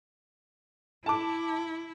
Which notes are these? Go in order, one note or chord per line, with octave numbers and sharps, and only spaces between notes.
E4 A5 D6